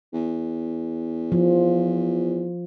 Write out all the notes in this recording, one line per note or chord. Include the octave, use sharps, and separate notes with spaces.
E2
F3